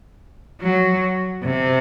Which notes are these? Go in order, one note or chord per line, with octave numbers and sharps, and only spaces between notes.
F#3
C3